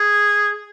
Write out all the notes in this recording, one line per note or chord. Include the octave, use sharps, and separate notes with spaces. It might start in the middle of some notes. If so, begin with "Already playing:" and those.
Already playing: G#4